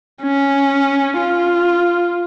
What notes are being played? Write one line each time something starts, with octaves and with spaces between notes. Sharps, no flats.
C#4
F4